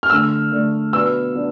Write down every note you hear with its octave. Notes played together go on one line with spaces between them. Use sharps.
F6
D3 A3 D4 E6
D3 A3 D4
B2 B3 D4 E6
B2 B3 D4